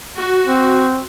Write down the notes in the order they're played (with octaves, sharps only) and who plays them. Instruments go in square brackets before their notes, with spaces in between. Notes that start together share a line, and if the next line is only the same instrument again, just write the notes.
[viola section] F#4
[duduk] C4